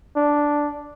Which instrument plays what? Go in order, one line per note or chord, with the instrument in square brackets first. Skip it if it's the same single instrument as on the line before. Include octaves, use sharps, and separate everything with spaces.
[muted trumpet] D4